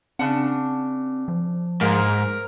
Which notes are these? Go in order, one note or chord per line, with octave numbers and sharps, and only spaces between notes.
C#3 C4 D4 F#5
F3
G#2 A#3 G#4 A#4 C5